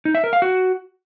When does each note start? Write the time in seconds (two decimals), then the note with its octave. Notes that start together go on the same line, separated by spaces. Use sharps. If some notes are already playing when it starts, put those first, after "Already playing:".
0.05 D#4
0.15 E5
0.24 A#4
0.33 F5
0.42 F#4